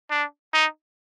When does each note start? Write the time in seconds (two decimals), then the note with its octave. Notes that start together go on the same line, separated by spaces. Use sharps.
0.11 D4
0.53 D#4